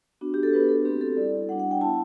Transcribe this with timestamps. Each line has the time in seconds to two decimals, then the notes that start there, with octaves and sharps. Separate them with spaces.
0.21 B3 D4 F#4
0.34 G4
0.43 A4
0.53 B3 D4 F#4 B4
0.69 A4
0.85 A3 C4 F#4 G4
1.01 A4
1.17 G3 B3 E4 D5
1.49 G3 D4 F#4 F#5
1.60 F#5
1.71 G5
1.81 E4 A5
1.84 B3